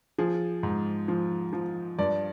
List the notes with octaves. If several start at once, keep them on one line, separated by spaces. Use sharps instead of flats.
F3 G#4
G#2
F3
F3
G2 D5